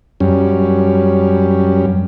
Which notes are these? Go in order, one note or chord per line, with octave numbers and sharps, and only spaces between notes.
F#2 G3 C#4